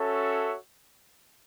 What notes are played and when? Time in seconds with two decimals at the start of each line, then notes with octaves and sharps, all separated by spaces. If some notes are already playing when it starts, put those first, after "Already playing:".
Already playing: C#4 F#4 A4 C#5 E5